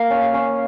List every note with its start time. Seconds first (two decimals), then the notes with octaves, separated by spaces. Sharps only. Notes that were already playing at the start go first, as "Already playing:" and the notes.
Already playing: A#3 F5
0.10 C#4
0.34 C#4